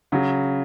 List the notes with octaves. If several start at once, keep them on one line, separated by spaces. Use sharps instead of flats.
C#3 F#3